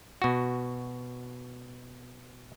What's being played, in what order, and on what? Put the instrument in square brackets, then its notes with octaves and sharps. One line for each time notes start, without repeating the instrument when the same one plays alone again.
[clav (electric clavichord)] B2 F#4